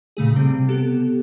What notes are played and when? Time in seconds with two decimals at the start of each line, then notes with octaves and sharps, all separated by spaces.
0.17 A#2 C#3 A3 G#4
0.35 C3 G3 C4
0.68 B3 G4 A4